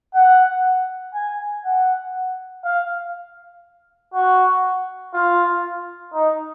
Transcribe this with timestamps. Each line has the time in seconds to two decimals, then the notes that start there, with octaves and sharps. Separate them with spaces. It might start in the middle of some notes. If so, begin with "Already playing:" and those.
0.14 F#5
1.14 G#5
1.65 F#5
2.64 F5
4.14 F#4
5.14 F4
6.14 D#4